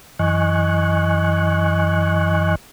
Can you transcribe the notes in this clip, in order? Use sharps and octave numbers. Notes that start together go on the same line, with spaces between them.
F#2 E3 D#5 G#5 C#6 F#6